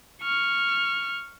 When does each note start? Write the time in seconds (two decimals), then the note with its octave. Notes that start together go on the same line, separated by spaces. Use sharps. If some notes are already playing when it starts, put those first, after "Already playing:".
0.23 C#6 F6